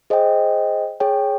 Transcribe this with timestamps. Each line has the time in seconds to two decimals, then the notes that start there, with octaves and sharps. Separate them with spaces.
0.10 G#4 C5 D#5 G5
1.00 G#4 C#5 G5